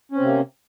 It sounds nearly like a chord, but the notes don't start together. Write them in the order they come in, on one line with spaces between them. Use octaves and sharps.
C#4 C4 C3 A#3